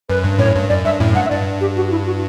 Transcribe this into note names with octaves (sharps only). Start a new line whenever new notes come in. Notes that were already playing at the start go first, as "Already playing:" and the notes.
F#2 B4
G2
F#2 A2 C#5
G2
F#2 D5
G2 E5
F#2 A2
G2 F#5
E5
G2 D5
G4
F#4
E4
F#4